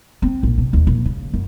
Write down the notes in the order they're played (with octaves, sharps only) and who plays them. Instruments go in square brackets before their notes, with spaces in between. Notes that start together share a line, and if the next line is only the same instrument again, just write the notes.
[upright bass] C4
A#1
C3
D#2
A#2
C#3
F#2